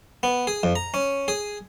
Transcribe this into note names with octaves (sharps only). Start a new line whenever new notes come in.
B3
G#4
F2
A#5
C#4
G#4